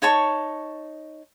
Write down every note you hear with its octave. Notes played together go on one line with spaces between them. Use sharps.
D#4 C#5 A5 C#6